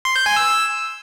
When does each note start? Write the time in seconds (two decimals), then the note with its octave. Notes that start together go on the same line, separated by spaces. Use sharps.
0.05 C6
0.16 G6
0.26 G#5
0.36 E6